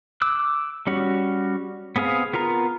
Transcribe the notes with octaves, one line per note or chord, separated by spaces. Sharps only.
D6 E6 F#6
G3 C#4 F#4
B3 C4 G#4 F5 D#6
B3 F4 A#4 A#5